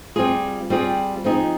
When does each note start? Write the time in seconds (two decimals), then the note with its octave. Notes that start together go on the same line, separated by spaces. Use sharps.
0.16 G3 C4 F4 G#4
0.70 G3 C4 F4 G#4
1.24 F3 C4 D#4 G#4